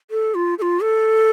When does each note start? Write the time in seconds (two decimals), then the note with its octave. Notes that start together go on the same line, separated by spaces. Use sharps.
0.11 A4
0.35 F4
0.58 A4
0.62 F4
0.82 A4